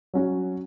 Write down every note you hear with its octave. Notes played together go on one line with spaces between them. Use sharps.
F#3 C#4 F#4